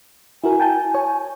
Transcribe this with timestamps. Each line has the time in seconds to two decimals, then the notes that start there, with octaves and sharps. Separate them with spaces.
0.44 E4 F#4 A#4 G#5
0.60 G5 A5 G6
0.94 C#5